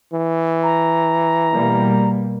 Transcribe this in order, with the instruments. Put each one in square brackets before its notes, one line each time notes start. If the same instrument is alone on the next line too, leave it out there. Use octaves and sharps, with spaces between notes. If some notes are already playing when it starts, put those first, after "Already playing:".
[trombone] E3
[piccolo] A#5
[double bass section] B2 G3 A#3